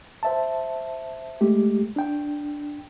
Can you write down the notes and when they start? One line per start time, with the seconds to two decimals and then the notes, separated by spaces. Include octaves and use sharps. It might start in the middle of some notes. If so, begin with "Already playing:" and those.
0.23 C5 E5 A5
1.41 G#3 A3 G4
1.96 D4 G5